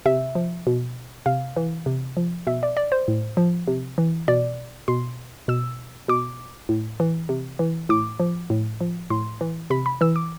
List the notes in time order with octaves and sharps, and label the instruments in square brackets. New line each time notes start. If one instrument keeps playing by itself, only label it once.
[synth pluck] C3 E5
F3
B2
C3 F5
E3
C3
F3
B2 E5
D5
D5
C5
A2
F3
C3
E3
B2 D5
B2 C6
B2 E6
B2 D6
A2
E3
C3
E3
A2 D6
F3
A2
F3
A2 C6
E3
C3 B5
B5
E3 E6
D6